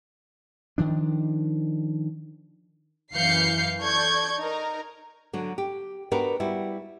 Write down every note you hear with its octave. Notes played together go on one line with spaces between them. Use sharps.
D#3 F3 D4
F#2 E3 F5 G6 C7 C#7
A4 D5 C#6 G6 G#6
D#4 A#4
D3 F#3 D4
G4
B3 D4 F#4 G4 A#4 B4
G3 E4 F#4